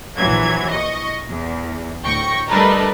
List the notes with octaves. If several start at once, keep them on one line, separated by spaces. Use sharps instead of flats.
A#1 E3 F#3 G#6
D#5 C#6
E2
D2 A2 G5 C#6 A#6
G3 A3 D4 A#4 B4 D#5